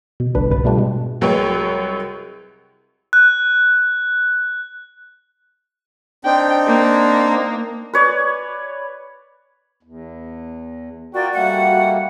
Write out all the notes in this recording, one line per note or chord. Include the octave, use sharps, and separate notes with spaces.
B2
G1 C2 A2 D3 D4 B4
G#2 C3 B4 A6
B2 G3 A3 D4 F4 G4
B2 G#3
C2 F#3 G#3 B4 C#5 G5
F#6
C4 D4 D#4 G5
A#3
B4 C#5 D5
E2
F4 F#4 A#4 D5 G5
G3 A3 A#3 F#5